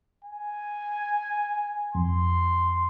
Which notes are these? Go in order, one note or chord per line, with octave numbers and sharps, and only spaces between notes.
G#5
F2 C6